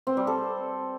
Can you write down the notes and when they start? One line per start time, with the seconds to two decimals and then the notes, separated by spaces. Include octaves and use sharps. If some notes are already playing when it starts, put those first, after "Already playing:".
0.07 C4
0.17 G3
0.27 A4